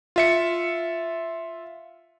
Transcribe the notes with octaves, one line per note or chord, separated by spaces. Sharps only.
F4 E5 C#7